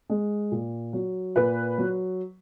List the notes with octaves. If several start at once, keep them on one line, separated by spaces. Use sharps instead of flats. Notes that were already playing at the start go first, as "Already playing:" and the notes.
G#3
A#2
F#3
A#2 B4
F#3